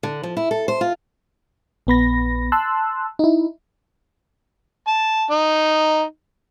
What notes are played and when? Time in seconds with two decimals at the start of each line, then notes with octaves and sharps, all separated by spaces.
0.03 D3
0.23 F3
0.37 E4
0.51 A4
0.68 C5
0.81 F4
1.87 A#1 B3 B5 A#6
2.52 A5 C6 E6 F#6
3.19 D#4 E4
4.87 A5
5.30 D#4